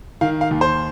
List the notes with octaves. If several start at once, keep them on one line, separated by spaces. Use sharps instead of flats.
D#3 F5
F5
D#2
C5